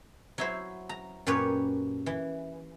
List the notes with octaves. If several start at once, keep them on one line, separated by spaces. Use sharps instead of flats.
F#3 E4 C5
A#5
F#2 A#2 G4 B4 C#5
E3